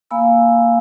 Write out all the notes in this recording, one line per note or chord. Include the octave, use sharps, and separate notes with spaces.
A#3 F5 G#5 B5 E6